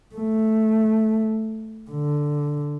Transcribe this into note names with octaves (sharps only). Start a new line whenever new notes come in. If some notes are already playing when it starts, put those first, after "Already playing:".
A3
D3